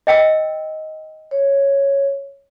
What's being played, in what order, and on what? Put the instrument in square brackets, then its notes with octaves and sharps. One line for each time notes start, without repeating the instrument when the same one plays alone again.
[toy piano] D#5 G5 E6
[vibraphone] C#5